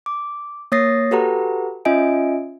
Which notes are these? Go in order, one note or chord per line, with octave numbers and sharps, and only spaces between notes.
D6
A#3 C#5 D#6 A6 A#6 C7
F#4 G4 A4 B4 F#5 A#5
C#4 F4 D#5 E5 G#5 D7